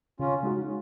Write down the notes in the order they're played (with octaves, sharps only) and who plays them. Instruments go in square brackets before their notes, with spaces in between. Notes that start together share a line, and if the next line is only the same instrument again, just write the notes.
[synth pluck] C#3 [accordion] C#4 F4
[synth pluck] G#3 D#4 F#4